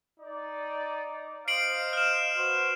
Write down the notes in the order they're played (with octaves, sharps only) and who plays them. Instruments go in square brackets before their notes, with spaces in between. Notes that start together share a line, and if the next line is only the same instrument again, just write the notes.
[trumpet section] D#4 D5
[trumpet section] C5 D#5 F5 [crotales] C7 D7 F#7
[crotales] F6 E7
[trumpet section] F#4 B4 C5